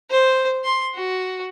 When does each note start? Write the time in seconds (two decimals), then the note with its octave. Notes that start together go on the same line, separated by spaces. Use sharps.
0.11 C5
0.64 C6
0.95 F#4